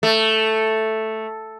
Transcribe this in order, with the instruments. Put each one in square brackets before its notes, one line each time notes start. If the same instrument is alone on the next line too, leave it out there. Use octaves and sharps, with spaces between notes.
[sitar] A3